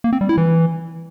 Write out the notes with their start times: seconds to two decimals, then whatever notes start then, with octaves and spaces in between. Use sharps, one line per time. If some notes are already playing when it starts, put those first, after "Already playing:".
0.04 A#3
0.13 C4
0.21 G3
0.29 E4
0.37 E3